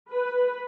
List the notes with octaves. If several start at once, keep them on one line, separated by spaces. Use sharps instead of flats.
B4